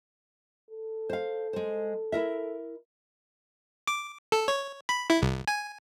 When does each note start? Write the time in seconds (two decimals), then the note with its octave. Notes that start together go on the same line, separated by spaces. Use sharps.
0.71 A4
1.10 C5 F5
1.53 G#3 C5
2.12 E4 A#4 E5
3.87 D6
4.32 A4
4.48 C#5
4.89 B5
5.10 E4
5.22 C2
5.48 G#5